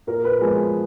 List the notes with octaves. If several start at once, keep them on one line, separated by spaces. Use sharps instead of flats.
A#2 A#4
B4
F3 G#3 B3 G#4